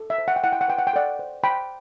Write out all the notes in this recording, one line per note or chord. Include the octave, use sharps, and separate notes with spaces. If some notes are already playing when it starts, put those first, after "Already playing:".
Already playing: A4
E5
C5
F#5
G5
E4 F#5
G5
F#5
B4 G5
F#5
G5
A4 D5 F#5
C5
C5 G5 B5